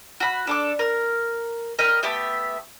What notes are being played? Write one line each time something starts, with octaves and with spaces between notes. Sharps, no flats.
F#4 B5
D4 A4 D6
A#4
A#4 D#5 G5 B5
A3 B3 G4 E5